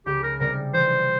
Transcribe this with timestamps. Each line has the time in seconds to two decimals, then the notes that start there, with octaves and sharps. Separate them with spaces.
0.06 C#2 G4
0.23 A#4
0.40 C3 G3 A#4
0.73 E3 C5